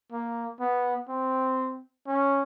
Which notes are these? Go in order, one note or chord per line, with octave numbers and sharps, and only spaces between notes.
A#3
B3
C4
C#4